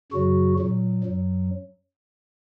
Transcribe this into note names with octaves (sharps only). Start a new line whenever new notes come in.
F#2 C#3 F#3 F#4
A#2 F#3
F#2 F#3